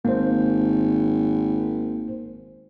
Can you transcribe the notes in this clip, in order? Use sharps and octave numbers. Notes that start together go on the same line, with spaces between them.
G#1 A#3 C5